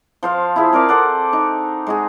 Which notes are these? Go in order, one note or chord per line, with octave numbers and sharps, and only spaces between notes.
F3 C5 F5
E4 F4 G#4 E5
C4 A#4 D5 F5
A4 C5 D5 F#5
D#4
G#3 F#4 G#4